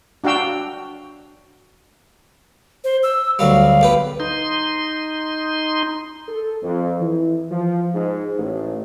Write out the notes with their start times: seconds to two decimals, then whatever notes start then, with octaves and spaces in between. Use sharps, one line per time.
0.24 D4 F#4 F5 G5 E6
2.84 C5
3.03 E6
3.39 D2 F#3 G3 F5
3.81 B1 G4 B4
4.20 D#4 C6
6.28 A4
6.63 F2
7.00 E3
7.51 F3
7.94 G#2
8.38 A1